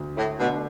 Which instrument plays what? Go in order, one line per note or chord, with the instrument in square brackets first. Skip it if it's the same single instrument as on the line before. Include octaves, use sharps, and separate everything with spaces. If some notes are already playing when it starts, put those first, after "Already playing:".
Already playing: [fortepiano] D2
[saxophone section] A2
[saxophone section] B2 [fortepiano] D3 A3 D4